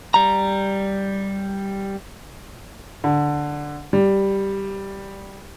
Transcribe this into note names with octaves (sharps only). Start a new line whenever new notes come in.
G3 A#5
D3
G3